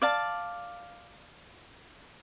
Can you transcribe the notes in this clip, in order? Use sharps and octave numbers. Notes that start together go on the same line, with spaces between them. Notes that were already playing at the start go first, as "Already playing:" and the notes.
D5 F5 A5